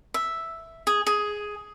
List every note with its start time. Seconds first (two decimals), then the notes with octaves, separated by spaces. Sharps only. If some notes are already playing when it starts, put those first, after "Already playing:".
0.14 E5
0.87 G#4
1.07 G#4